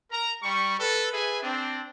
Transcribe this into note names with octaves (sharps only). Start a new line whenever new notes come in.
A#4 A#5
G3 C#6
A4 B4
G#4 B4 E5 G#5
C4 D4